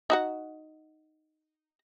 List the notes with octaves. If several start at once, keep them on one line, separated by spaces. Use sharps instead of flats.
D#4 F#4 F#5